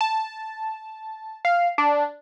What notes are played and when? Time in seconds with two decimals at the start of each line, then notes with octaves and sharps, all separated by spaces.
0.01 A5
1.45 F5
1.78 D4